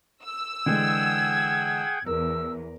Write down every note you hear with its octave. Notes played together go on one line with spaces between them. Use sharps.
E6
D3 E3 G#3 G#4 F#5 G5 G#6
E2 A#4 E6